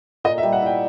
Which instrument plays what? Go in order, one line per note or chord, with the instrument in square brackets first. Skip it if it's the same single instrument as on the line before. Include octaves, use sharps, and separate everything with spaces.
[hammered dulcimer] A#2 [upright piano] D#5
[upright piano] E5
[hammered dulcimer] G3
[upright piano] F#5
[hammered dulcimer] E4 [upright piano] G5